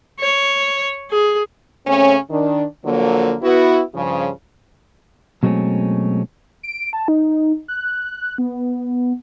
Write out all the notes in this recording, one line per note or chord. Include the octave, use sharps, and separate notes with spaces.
C#5
G#4
C#3 A3 C4 C#4
D#3 D4
D3 F3 F#3 A#3
B3 E4 F#4
G2 C#3 F3
B2 F#3 G#3 A3 C4 C#4
D7
A5
D#4
F#6
B3